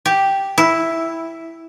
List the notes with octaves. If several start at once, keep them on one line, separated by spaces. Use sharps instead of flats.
G4
E4